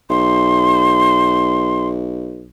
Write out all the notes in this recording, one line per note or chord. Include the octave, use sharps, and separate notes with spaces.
B1 C6